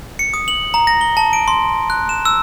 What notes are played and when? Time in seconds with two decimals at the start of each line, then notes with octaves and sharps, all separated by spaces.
0.19 C#7
0.34 D#6
0.48 F#7
0.74 A#5
0.87 A#6
1.01 G7
1.17 A5
1.33 D7
1.48 C6
1.90 F#6
2.09 E7
2.25 E6